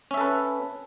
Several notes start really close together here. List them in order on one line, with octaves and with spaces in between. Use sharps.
C#4 E5 A4 B4